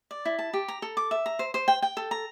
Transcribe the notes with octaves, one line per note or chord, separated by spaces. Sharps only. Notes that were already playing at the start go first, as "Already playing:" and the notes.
D5
E4
A5
G4
A#5
A4
D6
E5
A#5
C5
C5
G5
G5
A4
A#5